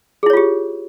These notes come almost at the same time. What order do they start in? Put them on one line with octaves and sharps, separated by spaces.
G#4 E4 C#5 F4 G4